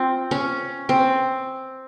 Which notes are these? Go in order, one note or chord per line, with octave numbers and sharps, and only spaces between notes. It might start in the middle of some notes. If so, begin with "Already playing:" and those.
Already playing: C4 F4
C#4
C4